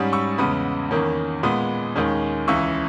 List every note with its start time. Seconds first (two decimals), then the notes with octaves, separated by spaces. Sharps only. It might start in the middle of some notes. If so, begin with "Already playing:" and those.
Already playing: G#2 G3 C#4 B5 D#6
0.13 C#6 E6
0.38 E2 C#3 G#3 B3 B5 D#6
0.91 E2 D#3 A#3 C#4
1.43 A#2 G#3 B3 B5 D#6
1.96 D#2 D#3 G#3 C#4
2.48 C#2 C#3 E3 C#6 E6